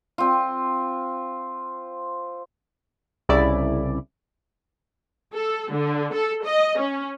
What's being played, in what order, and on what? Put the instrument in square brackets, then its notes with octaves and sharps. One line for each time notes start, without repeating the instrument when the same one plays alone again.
[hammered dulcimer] C4 F4
[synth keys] C2 C#3 E4 D5
[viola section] A4
D3
A4
D#5
C#4